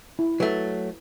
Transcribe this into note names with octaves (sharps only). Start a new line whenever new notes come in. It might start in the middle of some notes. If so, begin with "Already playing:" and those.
E4
F#3 A3 B4